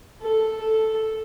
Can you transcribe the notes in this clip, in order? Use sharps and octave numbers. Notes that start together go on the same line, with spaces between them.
A4
A4